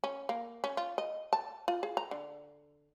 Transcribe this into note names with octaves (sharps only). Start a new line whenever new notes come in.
C#4
A#3
C#4
F4
D#5
A5
F4
G#4
A#5
D3